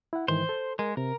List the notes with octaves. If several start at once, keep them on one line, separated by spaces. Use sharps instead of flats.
E4 F#5
G#2 D#3 E3 C5 C6
A4
G#3 A#4
C3 A#4